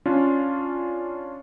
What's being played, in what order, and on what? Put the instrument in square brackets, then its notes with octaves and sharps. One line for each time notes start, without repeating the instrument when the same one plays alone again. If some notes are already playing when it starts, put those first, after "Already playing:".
[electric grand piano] C#4 D4 F4